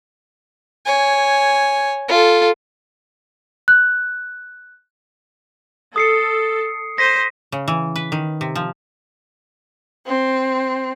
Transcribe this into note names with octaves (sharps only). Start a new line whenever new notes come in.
C#5 G#5
F4 A4
F#6
A4 D#6 C7 C#7
C5 A#6 B6 D#7
C#3
E3
B4
D#3
C3
F3
C4